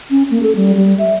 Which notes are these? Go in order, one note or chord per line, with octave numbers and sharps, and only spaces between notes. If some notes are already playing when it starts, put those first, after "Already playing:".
C#4
A#3
A4
G3
G3
E5